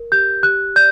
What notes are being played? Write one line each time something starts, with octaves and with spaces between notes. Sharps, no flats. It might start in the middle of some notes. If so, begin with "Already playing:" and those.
Already playing: A#4
G4 G6
G4 F#6
D5 G6